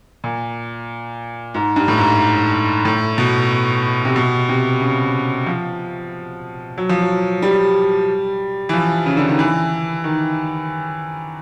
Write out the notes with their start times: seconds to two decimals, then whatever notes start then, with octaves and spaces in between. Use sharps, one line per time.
0.24 A#2
1.54 G#2
1.76 G2
1.88 A2
1.98 G#2
2.85 A2
3.18 B2
4.05 C3
4.16 B2
4.49 C3
4.81 C#3
5.47 F3
6.78 F#3
6.89 F3
7.02 F#3
7.42 G3
8.69 E3
8.73 F3
9.06 C#3
9.17 D3
9.28 D#3
9.39 E3
10.04 D#3